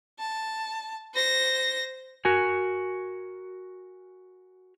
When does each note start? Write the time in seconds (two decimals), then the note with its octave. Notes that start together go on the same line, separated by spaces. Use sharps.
0.19 A5
1.14 C5 A#6
2.25 F#4 A#4 G#5